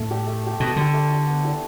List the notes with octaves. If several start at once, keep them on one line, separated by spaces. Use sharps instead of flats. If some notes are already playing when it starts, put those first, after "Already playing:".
Already playing: A2 A3
G4 E5
A3
G4 E5
B2 A3
D3 G4 E5
A3
G4 E5
B3
E4 G4 D5